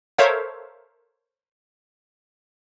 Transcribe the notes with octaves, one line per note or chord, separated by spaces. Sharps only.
A4 A#4 C5 C#5 E5 F5